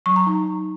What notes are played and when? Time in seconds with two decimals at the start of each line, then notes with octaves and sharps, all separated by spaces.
0.06 F#3 C#6
0.16 A#5
0.26 D#4